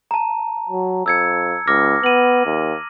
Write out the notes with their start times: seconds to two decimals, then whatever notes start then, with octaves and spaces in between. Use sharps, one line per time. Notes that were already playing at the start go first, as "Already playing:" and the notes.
0.11 A5 A#5
0.70 F#3
1.06 F2 E6 G#6 C#7
1.67 C#2 D6 F6 A#6
2.04 B3 D#7 F#7
2.46 D#2